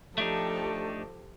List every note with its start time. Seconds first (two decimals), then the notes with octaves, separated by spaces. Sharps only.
0.18 F3 A3 D4 D#4 G4 A4